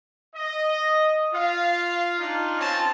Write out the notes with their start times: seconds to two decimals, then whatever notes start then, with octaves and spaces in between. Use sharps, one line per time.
0.35 D#5
1.34 F4 F5
2.19 D4 D#4 F4
2.60 C4 C#4 F4 A5